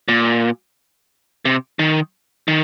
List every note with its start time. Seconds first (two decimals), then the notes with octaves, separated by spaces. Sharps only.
0.08 A#2
1.45 C3
1.79 D#3
2.48 D#3